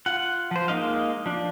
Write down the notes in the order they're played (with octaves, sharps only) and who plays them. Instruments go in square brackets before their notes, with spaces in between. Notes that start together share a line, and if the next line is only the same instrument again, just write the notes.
[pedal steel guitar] F4 F#5
F3 C5
G#3 A#3 D#4 D#5 F5
F3 D4